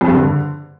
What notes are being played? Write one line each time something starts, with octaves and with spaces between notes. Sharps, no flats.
F2
G2
D3